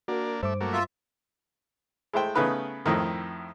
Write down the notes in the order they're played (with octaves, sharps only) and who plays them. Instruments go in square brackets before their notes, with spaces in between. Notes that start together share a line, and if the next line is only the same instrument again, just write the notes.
[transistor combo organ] A#3 D4 [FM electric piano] F#4 A#4
[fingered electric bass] G2 [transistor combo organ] A3 E5 [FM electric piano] C5 D6
[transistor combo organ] F#3 A3 A#3
[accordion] F4 E5
[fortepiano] G#3 A3 E4 C5 G5
C#3 A3 B3 D#4 B4 F6
F2 A2 D#3